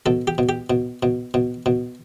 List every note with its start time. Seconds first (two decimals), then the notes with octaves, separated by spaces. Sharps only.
0.06 B2 A4
0.27 G4
0.38 B2
0.49 G4
0.70 B2
1.03 B2
1.34 B2
1.66 B2